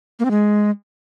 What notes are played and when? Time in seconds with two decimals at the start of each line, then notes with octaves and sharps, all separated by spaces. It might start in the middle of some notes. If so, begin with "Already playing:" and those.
0.19 A#3
0.25 C4
0.31 G#3